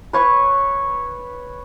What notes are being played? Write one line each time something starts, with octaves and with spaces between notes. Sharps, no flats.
B4 C#5 C#6